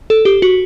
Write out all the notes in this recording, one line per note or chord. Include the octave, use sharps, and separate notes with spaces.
A4
G4
F#4